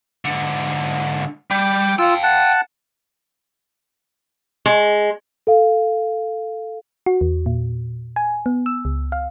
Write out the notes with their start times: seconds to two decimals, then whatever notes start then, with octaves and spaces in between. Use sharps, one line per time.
0.25 G#2 D3
1.51 G3 G5 D6
1.99 F4 F5 G5 E6
2.23 F#5 A5
4.66 G#3
5.47 A4 F5
7.06 F#4
7.21 E2
7.46 A#2
8.16 G#5
8.46 B3
8.66 E6
8.85 C#2
9.12 F5